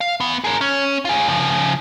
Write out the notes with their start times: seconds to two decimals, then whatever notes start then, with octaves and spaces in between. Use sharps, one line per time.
0.01 F5
0.20 E2 B3
0.44 G#4 A#4
0.61 C#4
1.05 F4 G#4
1.29 C#3 F3